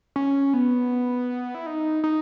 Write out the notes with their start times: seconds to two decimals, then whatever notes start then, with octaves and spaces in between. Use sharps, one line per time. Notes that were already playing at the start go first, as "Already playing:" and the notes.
0.16 C#4
0.54 B3
1.55 E4
1.66 D#4
2.04 D#4